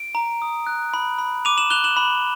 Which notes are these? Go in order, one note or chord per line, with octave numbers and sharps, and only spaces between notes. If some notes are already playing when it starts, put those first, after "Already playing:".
Already playing: D7
A#5
D#6
F#6
B5
B5
D6 D#7 F7
E7 F#7
F#6 F7 G7
E7 F#7
B5